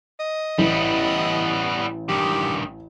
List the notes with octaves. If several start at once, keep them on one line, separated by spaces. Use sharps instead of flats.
D#5
A1 G3 B3
G2 D#3 G4